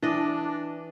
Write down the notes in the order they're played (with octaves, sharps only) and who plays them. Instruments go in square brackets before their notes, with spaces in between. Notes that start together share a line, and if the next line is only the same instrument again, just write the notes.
[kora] E3 D#5 [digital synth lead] D4